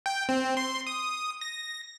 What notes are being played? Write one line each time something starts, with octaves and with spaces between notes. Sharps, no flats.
G5
C4
C6
D#6
A#6